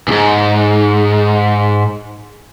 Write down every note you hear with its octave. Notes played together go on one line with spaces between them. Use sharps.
D2 G#2